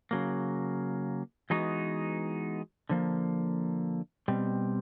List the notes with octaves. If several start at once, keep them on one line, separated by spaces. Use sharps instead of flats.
C#3 F#3 A#3
E3 G#3 B3 D#4 F#4
D3 F3 A#3
B2 G3 C4